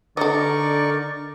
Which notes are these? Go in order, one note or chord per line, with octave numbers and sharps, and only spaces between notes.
D3 D#4 A4 A#4 D5 D#5 C#6